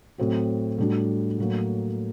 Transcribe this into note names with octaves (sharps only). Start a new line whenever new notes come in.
A2 F#3 C4 F#4
A2 G3 D4 F#4
A2 F#3 A#3